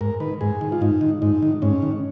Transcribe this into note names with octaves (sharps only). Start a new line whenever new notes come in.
G#2 A#4
D#3 B4
G#2 G#4
D#3
F4
G#2 D#4
D#3
G#2 D#4
D#3
G#2 C#4
D#3